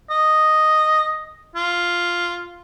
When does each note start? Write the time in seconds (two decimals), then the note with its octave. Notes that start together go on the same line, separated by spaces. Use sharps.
0.10 D#5
1.56 F4